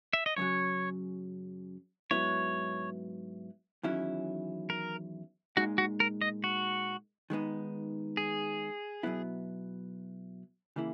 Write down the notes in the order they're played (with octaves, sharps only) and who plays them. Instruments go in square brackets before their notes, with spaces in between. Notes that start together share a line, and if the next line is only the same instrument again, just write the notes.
[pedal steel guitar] E5
D#5
[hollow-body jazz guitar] F#2 C#3 F#3 [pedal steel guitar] C#5
[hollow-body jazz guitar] G#2 F#3 B3 E4 [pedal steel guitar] C#5
[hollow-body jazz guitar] E2 D#3 F#3 C#4 E4
[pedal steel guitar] A#4
[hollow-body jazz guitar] A#2 G#3 D#4 [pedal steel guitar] F#4
[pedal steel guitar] F#4
A#4
D#5
F#4
[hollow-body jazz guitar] D#3 G#3 B3 D#4
[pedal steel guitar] G#4
[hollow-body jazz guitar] B2 F#3 B3 E4
C#3 E3 A#3 E4